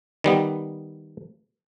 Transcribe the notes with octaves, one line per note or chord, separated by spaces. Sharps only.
D#3 G3 B3